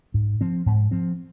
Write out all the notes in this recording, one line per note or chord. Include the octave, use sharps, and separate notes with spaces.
G#2
F3 C4
G#2
F3 C4